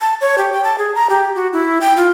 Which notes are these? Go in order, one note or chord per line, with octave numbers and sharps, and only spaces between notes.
A5
C#5
G4
G5
A5
G#4
A#5
G4
F#4
E4
G5
F4